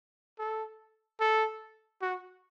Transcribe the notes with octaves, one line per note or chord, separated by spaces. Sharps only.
A4
A4
F#4